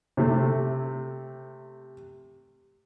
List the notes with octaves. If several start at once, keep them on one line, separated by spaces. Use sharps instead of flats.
C3 A3